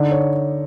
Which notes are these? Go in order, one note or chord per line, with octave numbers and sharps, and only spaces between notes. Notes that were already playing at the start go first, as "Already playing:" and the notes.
Already playing: D3 D#4 D5
C#5